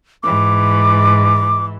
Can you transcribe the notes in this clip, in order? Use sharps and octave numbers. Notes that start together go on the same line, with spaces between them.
G#2 E3 D6